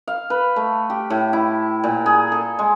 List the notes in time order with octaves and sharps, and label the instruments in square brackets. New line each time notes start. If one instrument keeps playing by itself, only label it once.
[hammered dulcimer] F5
B4
A3
G4
A2
E4
A#2
G#4
A4
G#3